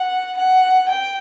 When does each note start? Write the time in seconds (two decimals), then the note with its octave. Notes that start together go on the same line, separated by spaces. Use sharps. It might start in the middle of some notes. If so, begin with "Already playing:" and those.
Already playing: F#5
0.36 F#5
0.88 G5